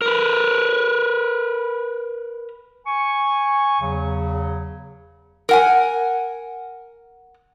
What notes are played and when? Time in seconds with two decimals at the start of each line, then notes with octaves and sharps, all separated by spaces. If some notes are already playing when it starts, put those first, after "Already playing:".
0.02 A#4 B4
2.86 G#5 C#6
3.81 E2 C#3 F#3
5.49 A#4 F#5 G#5